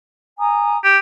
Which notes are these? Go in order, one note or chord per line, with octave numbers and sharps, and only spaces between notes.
G#5 A#5 D#6
G4